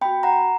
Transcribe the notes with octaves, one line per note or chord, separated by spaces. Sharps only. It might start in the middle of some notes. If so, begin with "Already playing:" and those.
B3 F#4 G5 B5
F#5 A#5